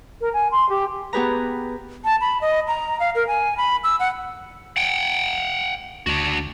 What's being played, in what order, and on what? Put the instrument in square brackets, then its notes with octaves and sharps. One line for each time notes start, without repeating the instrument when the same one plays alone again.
[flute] A#4
G#5
C6
G4
[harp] B3 G4 G#4 B4 A#5
[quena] A5
B5
D#5
A#5
F5
A#4
G#5
B5
E6
F#5
[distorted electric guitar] F#5 G5
[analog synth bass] D2 [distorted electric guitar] D4 F#4